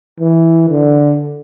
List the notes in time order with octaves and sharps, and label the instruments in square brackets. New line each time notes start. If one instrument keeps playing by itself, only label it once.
[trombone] E3
D3